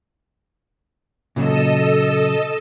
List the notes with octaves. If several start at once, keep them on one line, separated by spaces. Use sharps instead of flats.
A#2 C#3 F#3 A4 D#5 E6